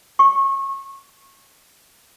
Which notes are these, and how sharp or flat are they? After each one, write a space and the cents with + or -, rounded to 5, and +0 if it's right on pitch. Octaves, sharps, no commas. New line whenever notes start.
C#6 -25